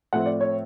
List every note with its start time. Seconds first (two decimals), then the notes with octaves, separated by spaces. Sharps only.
0.13 A2 F3 A3 C4 F#5
0.26 D5
0.41 C#5